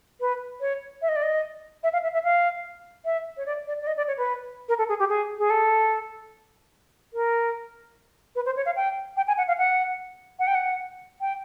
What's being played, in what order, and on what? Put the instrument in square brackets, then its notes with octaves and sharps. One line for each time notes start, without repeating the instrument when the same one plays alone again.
[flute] B4
C#5
E5
D#5
D5
D#5
E5
F5
E5
E5
F5
E5
C#5
D5
D5
D5
D#5
D5
C#5
B4
A#4
A4
G#4
G4
G#4
G#4
A4
A#4
B4
C5
C#5
F5
G5
G5
G#5
F#5
F5
F#5
F#5
G5
F#5
G5